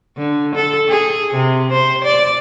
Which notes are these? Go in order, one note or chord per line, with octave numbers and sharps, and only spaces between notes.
D3
A4
G#4
C3
C5
D5